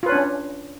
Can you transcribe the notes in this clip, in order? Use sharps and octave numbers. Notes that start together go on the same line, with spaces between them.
C#4 D4 F4 B4 C#5